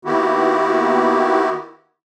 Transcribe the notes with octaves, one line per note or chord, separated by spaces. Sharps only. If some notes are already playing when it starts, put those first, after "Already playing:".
D#3 A#3 B3 E4 F#4 G4